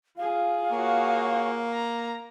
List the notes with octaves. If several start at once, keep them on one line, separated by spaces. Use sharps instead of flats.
F4 G#4 F5
A#3 F#4 C#5
A#5